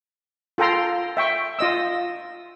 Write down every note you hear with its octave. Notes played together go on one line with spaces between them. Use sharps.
F4 A4 G5 A#5 C6
E5 G5 C#6
F4 D#5 E6